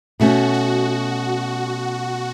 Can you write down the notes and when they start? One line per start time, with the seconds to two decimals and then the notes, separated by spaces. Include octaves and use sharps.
0.20 B2 A3 C#4 F#4
0.54 F#4